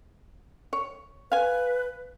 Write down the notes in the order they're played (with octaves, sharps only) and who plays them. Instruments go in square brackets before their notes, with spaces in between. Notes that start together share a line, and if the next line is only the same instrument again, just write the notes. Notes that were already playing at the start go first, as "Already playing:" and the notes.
[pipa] C#5
[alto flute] B4 [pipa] F5 G#5